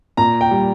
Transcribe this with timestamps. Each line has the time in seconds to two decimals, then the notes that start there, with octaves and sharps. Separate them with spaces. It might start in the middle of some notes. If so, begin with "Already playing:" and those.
0.17 A#2 A#5
0.41 G5
0.51 G3